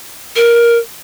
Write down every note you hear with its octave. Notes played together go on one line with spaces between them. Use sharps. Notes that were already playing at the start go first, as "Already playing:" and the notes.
A#4